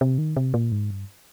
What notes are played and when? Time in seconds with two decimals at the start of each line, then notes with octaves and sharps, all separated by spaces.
0.01 C3
0.18 D#3
0.36 C3
0.54 A#2
0.72 G#2
0.90 G2